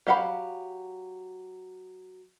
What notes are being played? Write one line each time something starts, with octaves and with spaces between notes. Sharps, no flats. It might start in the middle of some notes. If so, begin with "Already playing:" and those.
F#3 G4 F5 F#5 B5